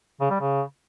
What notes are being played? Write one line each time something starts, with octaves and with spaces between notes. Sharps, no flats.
C#3
G3
C#3